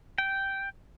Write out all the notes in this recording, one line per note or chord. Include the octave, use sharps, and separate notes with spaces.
G5